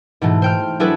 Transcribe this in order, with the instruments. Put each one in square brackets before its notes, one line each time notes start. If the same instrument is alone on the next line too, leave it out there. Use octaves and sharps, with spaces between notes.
[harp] G#2 B2 E3 A3
C5 G5 F6
F#3 D4 E4 G#4 A4 B4